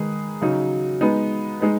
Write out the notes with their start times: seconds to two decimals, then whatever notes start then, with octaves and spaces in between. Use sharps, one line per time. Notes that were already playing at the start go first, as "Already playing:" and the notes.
Already playing: D#3 G#3 D#4 G#4 B4
0.41 C#3 F#3 D#4
1.01 G#3 B3 D#4
1.60 G#3 D#4 B4